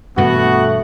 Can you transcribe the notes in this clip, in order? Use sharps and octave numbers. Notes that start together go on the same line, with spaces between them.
G2 B2 E3 A3 B3 F#4 F#5